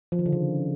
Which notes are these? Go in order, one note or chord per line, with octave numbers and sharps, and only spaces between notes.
F3
D#3
D3
C#3